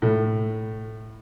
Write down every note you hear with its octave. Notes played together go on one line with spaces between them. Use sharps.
A2